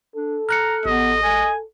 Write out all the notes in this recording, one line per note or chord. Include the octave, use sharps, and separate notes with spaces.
D4 A4
A#5 F6 F#6 C#7
A1 B3 D#5
A4 G#5